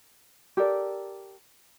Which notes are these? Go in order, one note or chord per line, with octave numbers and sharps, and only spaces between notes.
G4 A4 A#4 D5